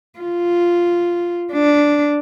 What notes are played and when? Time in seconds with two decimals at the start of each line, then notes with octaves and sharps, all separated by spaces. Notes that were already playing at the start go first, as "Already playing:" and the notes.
0.19 F4
1.52 D4